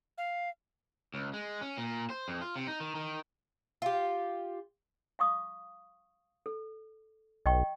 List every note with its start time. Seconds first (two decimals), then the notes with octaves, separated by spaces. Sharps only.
0.18 F5
1.14 C#2
1.34 G#3
1.61 C#4
1.78 A#2
2.10 C5
2.28 F2
2.41 F4
2.56 C3
2.67 D#4
2.80 D#3
2.95 D#3
3.82 F4 G4
5.19 F5 C#6 D#6
6.46 A4
7.46 B1 D#5 G5 C#6